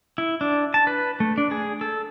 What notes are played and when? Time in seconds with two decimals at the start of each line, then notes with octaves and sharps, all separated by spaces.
0.18 E4
0.41 D4
0.74 A5
0.87 B4
1.20 A3
1.38 D4
1.51 G#4
1.81 A4